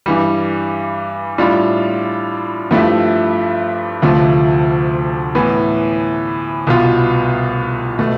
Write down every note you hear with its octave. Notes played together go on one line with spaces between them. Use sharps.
G2 E3 G3
A2 G3 D4 F4
G2 F3 A3 E4 G4
D2 C3 F3 A3
A2 E3 B3
C2 B2 B3 F4
B2 A3